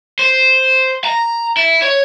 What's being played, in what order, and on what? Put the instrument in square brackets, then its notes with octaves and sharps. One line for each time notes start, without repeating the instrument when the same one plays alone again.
[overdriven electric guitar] C5
A#5
E4
C#5